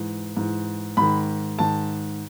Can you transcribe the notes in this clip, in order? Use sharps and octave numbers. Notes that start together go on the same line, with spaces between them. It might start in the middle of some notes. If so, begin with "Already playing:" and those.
Already playing: G#2 E3
G#2 E3
G#2 D#3 B5
G#2 D#3 A5